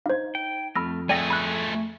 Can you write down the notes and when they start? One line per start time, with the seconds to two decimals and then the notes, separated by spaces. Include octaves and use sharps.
0.06 D#4 C5 F5 G#6
0.35 G5
0.76 F2 A3 B5 E6 F6 A#6
1.09 A3 G#4 D5 G5 G#5 C#6 E6 A#6
1.30 B5 F#6